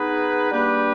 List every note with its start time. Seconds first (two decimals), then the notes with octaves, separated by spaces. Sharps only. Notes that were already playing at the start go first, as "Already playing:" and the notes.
Already playing: B3 D#4 G#4 B4
0.51 G3 A#3 D4 G4 B4